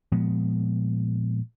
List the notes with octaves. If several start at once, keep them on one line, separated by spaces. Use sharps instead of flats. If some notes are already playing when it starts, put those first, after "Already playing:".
A#2 F3 G#3 B3